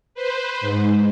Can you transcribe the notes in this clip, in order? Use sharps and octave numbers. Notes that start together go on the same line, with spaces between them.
B4 C5
G#2